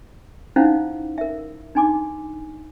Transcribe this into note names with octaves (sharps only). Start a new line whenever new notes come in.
C#4 D#4 E4 C5 F5 F#5
A#4 E5
D4 D#4 G#5 C6 D6